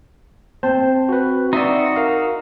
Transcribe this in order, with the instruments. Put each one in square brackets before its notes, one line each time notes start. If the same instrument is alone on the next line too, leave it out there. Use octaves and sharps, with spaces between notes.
[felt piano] C4 [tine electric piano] C5 A5
[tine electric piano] F#4 B4
[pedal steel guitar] D#4 F#4 [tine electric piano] D5 E5 C6
[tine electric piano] A#4 F5